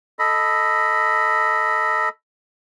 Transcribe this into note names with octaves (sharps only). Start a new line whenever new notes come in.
A4 D#5 B5